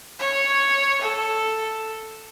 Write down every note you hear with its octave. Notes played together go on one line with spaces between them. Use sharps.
C#5
A4